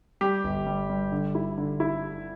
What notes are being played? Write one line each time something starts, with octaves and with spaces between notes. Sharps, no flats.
G3 G4
G1
G3
G3
D3
E4
D3
E4